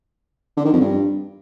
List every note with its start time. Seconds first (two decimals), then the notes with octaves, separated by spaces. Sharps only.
0.57 D3
0.65 D#3
0.73 F2
0.81 G2